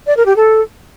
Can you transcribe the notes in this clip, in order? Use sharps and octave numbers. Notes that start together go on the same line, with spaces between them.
D5
A#4
G4
A4